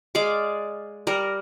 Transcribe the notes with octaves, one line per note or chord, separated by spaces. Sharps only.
G#3 D5 F5 D6
G3 A#4